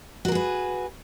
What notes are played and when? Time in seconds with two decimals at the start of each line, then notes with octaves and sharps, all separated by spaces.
0.25 F#4
0.28 A#4
0.32 G#4
0.35 B4